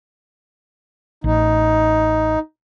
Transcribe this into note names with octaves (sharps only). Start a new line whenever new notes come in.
A1 D#4